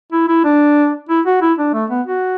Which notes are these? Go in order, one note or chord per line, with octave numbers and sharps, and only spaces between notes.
E4
E4
D4
E4
F#4
E4
D4
A3
B3
F#4